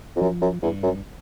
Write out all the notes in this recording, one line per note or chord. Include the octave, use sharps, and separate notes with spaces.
F2
F#2 F3
F#2
E2 G2
F#2